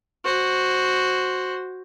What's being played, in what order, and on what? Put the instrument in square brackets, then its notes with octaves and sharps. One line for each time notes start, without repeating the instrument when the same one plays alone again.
[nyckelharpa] F#4 C5